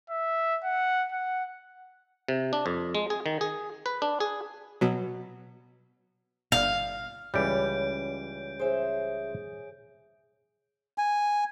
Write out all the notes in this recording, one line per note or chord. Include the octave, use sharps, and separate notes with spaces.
E5
F#5
F#5
C3
D4
F2
G#3
G#4
D#3
G#4
B4
D4
G#4
B2 F#3
G1 F5 G6
C#2 E3 G3 C#5 G6 D7
G#4 C5 E5
G#5